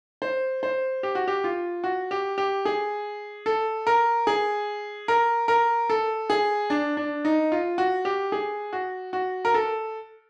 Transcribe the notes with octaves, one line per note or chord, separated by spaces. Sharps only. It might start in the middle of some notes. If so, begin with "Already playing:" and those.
C5
C5
G4
F#4
G4
F4
F#4
G4
G4
G#4
A4
A#4
G#4
A#4
A#4
A4
G#4
D4
D4
D#4
F4
F#4
G4
G#4
F#4
F#4
A#4
A4